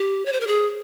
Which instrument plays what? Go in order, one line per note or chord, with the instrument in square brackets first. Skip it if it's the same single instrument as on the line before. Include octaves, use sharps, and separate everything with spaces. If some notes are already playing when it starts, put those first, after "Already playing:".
Already playing: [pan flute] G4
C#5
C5
A#4
G#4